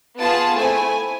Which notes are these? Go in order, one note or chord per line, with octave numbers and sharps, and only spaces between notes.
B3 F4 G#4 A5
A3 C4 E4 G#5